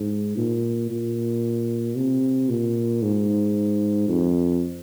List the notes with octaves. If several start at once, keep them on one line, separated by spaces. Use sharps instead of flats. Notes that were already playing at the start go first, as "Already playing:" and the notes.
Already playing: G#2
A#2
A#2
C3
A#2
G#2
F2